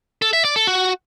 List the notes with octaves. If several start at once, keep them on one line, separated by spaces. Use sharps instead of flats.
A4
E5
D5
A4
F#4